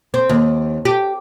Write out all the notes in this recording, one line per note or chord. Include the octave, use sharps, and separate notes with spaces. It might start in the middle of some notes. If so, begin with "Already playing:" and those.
C4
D#2
G4